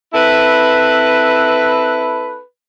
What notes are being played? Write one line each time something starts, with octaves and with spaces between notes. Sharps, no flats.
C4 E4 A4 B4